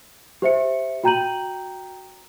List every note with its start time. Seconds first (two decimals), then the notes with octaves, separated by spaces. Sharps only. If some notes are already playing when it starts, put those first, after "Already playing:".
0.42 G4 C5 E5 C#7
1.03 F#4 G5 A#5 G6 D#7 F#7